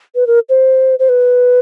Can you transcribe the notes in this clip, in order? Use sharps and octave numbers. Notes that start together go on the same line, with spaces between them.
B4
A#4
C5
C5
B4